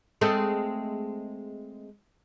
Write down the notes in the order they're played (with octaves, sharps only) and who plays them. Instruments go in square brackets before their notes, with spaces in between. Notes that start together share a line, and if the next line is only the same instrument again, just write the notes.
[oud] G#3 A3 C4